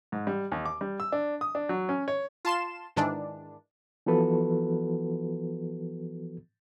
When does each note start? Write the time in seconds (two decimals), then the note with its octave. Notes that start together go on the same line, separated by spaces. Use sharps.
0.12 G#2
0.27 G3
0.52 D#2
0.66 D6
0.81 G3
1.00 E6
1.12 D4
1.41 D#6
1.55 D4
1.69 F#3
1.89 C#4
2.08 C#5
2.45 F4 A5 C6 E7
2.96 G#2 D#3 E3 D4
4.06 E3 F3 B3 F#4 A4 B4